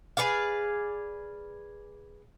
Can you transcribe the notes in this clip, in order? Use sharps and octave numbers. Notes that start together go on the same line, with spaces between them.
G#4 B4 D5 F5